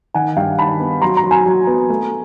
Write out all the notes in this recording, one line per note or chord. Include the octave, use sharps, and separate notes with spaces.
D#3 F#5 G#5
G2 F5 G5
D#3 A5 B5
B3
F#3 A#5 C6
A#5 C6
F#3
G#5 A#5
F#3
B3
A3